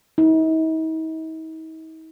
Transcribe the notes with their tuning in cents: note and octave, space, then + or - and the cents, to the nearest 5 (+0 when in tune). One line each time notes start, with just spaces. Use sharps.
D#4 +45